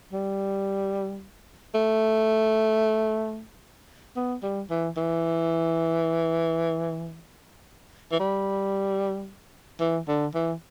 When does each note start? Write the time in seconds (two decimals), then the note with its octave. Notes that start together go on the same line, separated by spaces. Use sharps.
0.13 G3
1.75 A3
4.16 B3
4.43 G3
4.70 E3
4.97 E3
8.12 E3
8.20 G3
9.80 E3
10.08 D3
10.35 E3